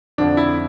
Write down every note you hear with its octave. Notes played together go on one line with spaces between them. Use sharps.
F2 D3 F3 D4
E4